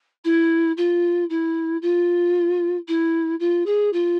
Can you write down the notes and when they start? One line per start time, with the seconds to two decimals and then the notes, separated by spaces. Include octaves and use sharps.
0.24 E4
0.77 F4
1.30 E4
1.82 F4
2.88 E4
3.40 F4
3.66 G#4
3.93 F4